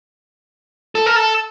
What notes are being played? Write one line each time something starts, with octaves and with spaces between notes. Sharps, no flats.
A4
A#4
A4